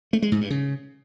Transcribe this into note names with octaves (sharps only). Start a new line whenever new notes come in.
A3
G#3
G#2
G2
C#3